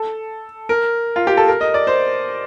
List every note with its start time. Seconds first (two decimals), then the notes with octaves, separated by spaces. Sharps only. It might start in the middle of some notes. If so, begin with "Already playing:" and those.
Already playing: A4
0.69 A#4
1.16 F4
1.27 G4
1.37 A4
1.48 A#4
1.61 D#5
1.74 D5
1.87 C5